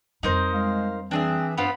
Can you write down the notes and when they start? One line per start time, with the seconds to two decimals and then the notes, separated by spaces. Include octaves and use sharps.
0.23 F2 G3 D#4 A#4 C5
0.53 G#3 F5
1.11 E3 C4 D4 G#4 E5
1.58 G2 B3 C4 F4 B5